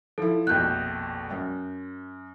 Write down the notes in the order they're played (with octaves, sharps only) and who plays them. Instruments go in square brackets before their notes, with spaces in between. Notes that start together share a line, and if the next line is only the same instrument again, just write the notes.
[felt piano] F3 E4 [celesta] A4
[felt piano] A#1 F2 B2 [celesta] F#6 G6
[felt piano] F#2